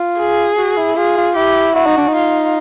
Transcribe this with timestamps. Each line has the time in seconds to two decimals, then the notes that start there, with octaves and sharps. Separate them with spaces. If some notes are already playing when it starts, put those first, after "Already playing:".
Already playing: F4
0.19 G#4
0.57 F#4
0.77 E4
0.96 F4 G#4
1.17 F4
1.36 E4 G4
1.75 E4 F#4
1.86 D#4
1.97 D4
2.07 D#4
2.15 F4